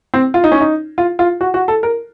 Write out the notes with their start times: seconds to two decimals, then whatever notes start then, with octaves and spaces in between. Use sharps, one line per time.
0.14 C4
0.34 F4
0.44 D#4
0.52 C#4
0.61 D#4
0.98 F4
1.19 F4
1.41 F#4
1.54 F#4
1.68 A4
1.83 A#4